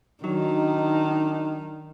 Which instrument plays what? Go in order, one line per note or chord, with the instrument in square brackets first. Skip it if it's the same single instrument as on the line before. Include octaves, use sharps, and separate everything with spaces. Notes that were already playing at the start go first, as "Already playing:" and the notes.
[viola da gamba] D#3 [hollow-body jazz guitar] F#3 [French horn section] D4 D#4